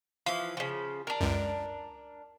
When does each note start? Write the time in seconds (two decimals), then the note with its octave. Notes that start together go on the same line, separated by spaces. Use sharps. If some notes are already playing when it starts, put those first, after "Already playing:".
0.26 E3 F3 F5
0.57 C#3 F3
1.07 D4 A#4
1.21 C#2 F#2